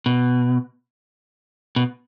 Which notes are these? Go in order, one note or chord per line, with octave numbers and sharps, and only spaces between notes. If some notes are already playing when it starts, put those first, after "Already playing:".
B2
B2